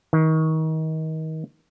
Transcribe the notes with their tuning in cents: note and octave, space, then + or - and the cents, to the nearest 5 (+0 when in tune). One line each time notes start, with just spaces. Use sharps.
D#3 +30